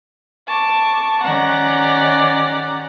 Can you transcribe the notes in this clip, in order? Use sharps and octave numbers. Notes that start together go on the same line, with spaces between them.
A5 C#6 D6
D#3 C#4 G4 D5 F#5 A#5